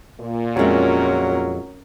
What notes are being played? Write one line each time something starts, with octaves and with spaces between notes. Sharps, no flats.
A#2
F2 F#3 G#3 C#4 A#4 E5